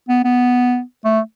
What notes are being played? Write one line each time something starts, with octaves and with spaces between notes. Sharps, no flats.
B3
B3
A3